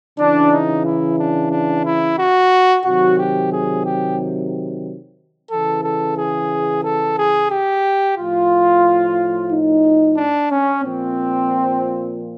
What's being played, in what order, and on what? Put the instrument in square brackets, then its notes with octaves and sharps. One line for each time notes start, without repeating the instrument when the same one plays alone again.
[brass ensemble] C#3 E3 D4
D#4
E4
D4
D4
E4
F#4
C3 D#3 F#3 F#4
G4
G#4
G4
C#3 E3 A4
A4
G#4
A4
G#4
G4
A2 F3 F4
D#4
D4
C#4
A#2 F3 C4